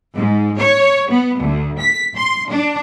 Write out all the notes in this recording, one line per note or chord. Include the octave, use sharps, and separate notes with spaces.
G#2
C#5
B3
D2
B6
C6
D4